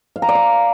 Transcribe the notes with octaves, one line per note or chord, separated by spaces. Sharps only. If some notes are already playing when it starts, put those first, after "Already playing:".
F5
A#5
D5
F5